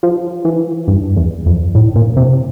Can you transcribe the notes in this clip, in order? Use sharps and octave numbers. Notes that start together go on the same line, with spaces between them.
F3
E3
G2
E2
F2
A2
A#2
C3